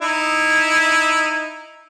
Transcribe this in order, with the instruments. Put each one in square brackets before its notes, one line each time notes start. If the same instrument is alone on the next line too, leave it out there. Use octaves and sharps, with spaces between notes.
[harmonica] D#4 E4